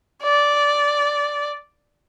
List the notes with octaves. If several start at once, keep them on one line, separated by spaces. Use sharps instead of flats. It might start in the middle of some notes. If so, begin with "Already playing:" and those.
D5